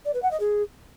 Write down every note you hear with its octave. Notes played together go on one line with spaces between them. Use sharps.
D5
B4
F#5
D#5
G#4